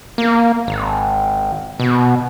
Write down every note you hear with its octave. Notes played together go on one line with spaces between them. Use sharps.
A#3
G#1
B2